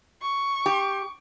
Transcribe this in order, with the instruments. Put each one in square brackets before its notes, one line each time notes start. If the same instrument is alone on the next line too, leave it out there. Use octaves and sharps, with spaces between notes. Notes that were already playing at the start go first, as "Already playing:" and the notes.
[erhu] C#6
[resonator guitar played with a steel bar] G4